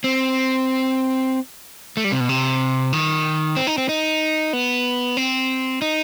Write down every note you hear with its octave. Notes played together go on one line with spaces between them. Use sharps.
C4
A3
G3
C3
B2
C3
D#3
C4
D#4
C4
D#4
B3
C4
D#4